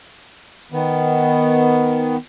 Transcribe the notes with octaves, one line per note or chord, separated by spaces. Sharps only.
D#3 B3